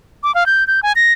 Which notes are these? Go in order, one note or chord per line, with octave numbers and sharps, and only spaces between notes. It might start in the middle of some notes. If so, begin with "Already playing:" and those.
D6
F5
G6
G6
G#5
A#6